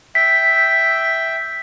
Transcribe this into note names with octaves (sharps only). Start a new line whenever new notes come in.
E5 G5 B6